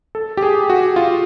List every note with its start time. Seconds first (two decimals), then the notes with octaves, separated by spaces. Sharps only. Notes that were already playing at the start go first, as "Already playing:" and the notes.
0.15 A4
0.37 G4
0.43 G#4
0.70 F#4
0.96 F4